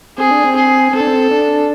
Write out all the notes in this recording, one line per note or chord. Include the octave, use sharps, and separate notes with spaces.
C4 G#4
D4
C4
G#4
C4 A4
D4
C4
D4